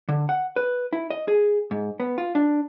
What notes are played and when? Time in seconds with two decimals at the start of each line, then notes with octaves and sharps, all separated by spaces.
0.09 D3
0.29 F#5
0.56 B4
0.93 E4
1.10 D#5
1.28 G#4
1.71 G#2
2.00 B3
2.18 F4
2.35 D4